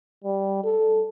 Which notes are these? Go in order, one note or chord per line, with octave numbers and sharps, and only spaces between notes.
G3
A4